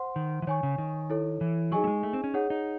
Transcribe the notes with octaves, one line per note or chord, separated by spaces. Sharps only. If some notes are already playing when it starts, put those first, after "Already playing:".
Already playing: C5 F#5 C6
D#3
E3
D#3 C#5 G#5 C#6
C#3
D#3
E4 A4 C#5
E3
F#3 D#4 G#4 D#5 G#5 C#6
A3
G#3
A3
C4
C#4
D#4 G#4 C#5 F#5
D#4